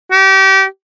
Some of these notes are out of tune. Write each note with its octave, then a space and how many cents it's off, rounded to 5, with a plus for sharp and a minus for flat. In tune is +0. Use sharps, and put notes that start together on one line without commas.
G4 -30